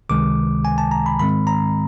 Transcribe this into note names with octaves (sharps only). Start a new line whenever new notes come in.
C#2 C3 D#3 G#3 D6
G#5
A5
A#5
B5
G#2 D#3 G#3 C4 B5
A#5